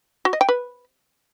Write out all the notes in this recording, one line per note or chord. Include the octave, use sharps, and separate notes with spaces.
F#4
D#5
G5
B4